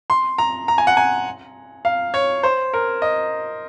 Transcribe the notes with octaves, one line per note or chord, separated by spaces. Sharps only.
C6
A#5
A#5
G#5
F#5
G#5
F5
C#5
C5
A#4
D#5